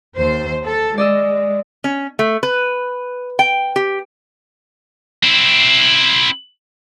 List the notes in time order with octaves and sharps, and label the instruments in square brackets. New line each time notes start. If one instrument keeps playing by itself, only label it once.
[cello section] D#2 C5
A4
[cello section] G#3 [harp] D5 D#5 E6
[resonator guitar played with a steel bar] C#4
A3
B4
G5
G4
[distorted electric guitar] C4 E4